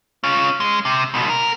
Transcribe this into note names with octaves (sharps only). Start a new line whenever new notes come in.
C#4 F4
G#3
C3
C#2 B2
A#4